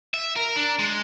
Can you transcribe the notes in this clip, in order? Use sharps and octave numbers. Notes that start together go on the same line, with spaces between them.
E5
A#4
D4
G#3